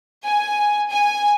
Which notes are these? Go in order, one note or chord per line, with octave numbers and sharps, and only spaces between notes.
G#5
G#5